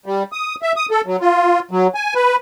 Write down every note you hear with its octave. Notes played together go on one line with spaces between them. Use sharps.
G3
D#6
E5
D#6
A4
F#3
F4
F#3
G#5
B4